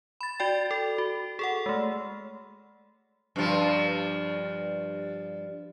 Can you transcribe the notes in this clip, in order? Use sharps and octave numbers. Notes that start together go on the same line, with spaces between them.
B5 A6
F#4 D5 G5
A4
F#4
G#4 A4 F#5
G#3 A3
G2 F3